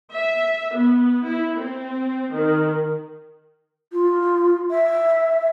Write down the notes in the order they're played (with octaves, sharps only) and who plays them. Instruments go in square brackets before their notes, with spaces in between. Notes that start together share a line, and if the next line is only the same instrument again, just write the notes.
[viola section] E5
B3
E4
C4
D#3
[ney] F4
E5